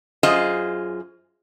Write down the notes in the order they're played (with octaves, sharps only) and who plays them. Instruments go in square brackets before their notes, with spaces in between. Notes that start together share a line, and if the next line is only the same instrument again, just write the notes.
[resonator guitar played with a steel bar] F#2 F4 G#4 C5 D#5